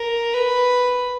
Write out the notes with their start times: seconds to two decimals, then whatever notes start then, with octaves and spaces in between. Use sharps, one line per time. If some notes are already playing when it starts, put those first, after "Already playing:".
Already playing: A#4
0.33 B4